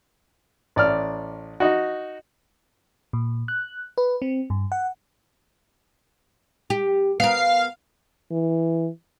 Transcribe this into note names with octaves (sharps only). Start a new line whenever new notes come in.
A1 D5 F6
D#4 F#4
A#2
F#6
B4
C4
G2
F#5
G4
B3 A#4 F5
E3